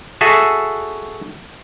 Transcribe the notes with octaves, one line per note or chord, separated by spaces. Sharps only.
F#4 G#4 A4 E5